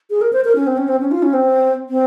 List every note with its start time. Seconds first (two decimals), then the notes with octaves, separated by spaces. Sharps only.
0.10 G#4
0.21 A#4
0.33 C5
0.44 A#4
0.55 C#4
0.67 C4
0.77 C#4
0.88 C4
1.00 C#4
1.11 F4
1.22 C#4
1.33 C4
1.89 C4